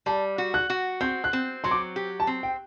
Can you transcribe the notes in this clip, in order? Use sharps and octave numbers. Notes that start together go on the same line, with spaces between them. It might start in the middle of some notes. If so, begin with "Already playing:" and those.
G3 A5
F#4
F#6
F#4
C4 G6
F#6
C4
F#3 C6
D6
G4
A5
C4
G5